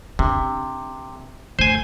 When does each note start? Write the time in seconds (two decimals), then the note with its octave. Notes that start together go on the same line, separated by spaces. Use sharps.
0.19 C3 D4
1.59 A3 C5 G#5